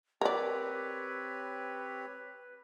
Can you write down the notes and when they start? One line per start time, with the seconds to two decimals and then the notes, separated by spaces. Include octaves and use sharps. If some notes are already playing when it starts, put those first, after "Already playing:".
0.21 C4 G4 A#4 B4 C#5 D5